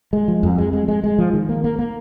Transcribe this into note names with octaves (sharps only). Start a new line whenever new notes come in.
G#3
F3
F2
G#3
G#3
G#3
G#3
F3
D#3
A#3
A#3
A#3